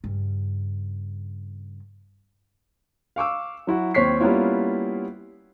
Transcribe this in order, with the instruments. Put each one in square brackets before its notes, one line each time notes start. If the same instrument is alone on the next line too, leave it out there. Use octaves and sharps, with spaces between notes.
[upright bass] G2 C#3
[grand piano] F5 C#6 D6 E6
F#3 E4 F#4
D#2 C4 C#5 C#6 B6 C7
G3 A#3 B3 C#4 E4 F4